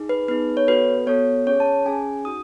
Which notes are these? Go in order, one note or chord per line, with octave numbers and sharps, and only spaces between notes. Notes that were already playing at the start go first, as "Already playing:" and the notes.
Already playing: D#4 G#4
B4
B3 D#4 G#4 B4
C#5
B3 F#4 A4 B4
B3 F#4 A4 C#5
C#4 G#4 C#5
A5
C#4 G#4 G#5
D#4 F#4 D#6